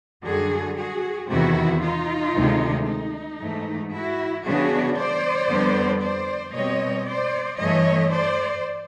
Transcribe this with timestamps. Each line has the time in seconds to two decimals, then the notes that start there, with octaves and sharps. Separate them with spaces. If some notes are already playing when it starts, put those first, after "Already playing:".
0.25 F#2 D3 G3 F#4 G#4
0.77 F#4 G#4
1.29 E2 C3 D#3 E4 F#4
1.82 D#4 F4
2.35 D2 C3 D#3 G#3
2.87 D#4
3.39 G#2 E3 A3
3.92 E4 F#4
4.44 C#3 E3 G3 B3 D4 F#4 G#4
4.96 C5 D5
5.49 F2 D3 G3 B3
6.01 C5 D5
6.54 B2 G3 C4 C#5 D#5
7.06 C5 D5
7.58 G2 E3 A3 C#5 D#5
8.11 C5 D5